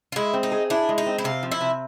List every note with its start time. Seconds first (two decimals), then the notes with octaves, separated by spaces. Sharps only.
0.12 F4
0.16 G#3 E4
0.34 C4
0.43 D#4
0.52 G#4
0.70 D4 E4
0.89 G#3
0.98 D#4
1.06 C4
1.18 E4
1.24 C3 F4
1.43 F3
1.52 E4
1.61 C3